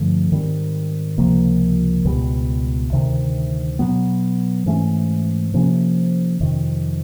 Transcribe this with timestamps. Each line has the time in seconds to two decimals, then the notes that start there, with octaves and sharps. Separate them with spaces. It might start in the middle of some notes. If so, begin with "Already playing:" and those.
Already playing: G2 D3 F3 A3
0.32 G#2 D#3 G3 C4
1.18 C#2 C3 F3 A#3
2.05 C#2 B2 G3
2.92 D2 C3 D#3
3.79 B2 F#3 B3
4.66 G#2 E3 A3 C#4
5.54 C3 F3 A#3 C#4
6.40 F2 C3 D#3